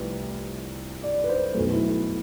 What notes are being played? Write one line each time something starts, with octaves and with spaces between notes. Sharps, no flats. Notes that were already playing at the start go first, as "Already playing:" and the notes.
Already playing: C2 C3 F3 A3 C4 G4 B4
D5
B4
C5
B1 B2 A3 B4
E4
E4